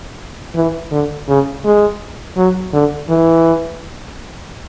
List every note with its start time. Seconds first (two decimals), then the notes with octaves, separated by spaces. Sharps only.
0.55 E3
0.91 D3
1.28 C#3
1.65 G#3
2.37 F#3
2.73 D3
3.09 E3